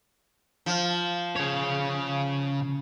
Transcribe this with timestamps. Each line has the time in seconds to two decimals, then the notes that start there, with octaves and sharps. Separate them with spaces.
0.66 F3
1.36 C#3 C#5